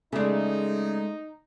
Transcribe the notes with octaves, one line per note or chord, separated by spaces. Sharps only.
C#3 G#3 A3 D#4 D5